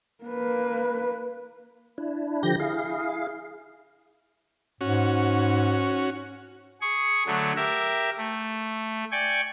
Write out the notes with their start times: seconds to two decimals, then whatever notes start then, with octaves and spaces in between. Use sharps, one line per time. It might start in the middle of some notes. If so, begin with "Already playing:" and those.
0.24 A#3 B4
1.98 D4 E4
2.43 D3 F3 G4 G6 A#6
2.60 E4 G#4 F5
4.81 G#2 C#4 F#4
6.81 G#4 C#6
7.26 D3 F#3 A3
7.56 G4 A#4 E5
8.17 A3
9.12 D5 G5 G#5 C#6